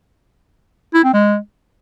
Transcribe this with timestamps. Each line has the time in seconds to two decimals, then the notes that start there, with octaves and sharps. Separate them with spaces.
0.94 E4
1.04 C4
1.13 G#3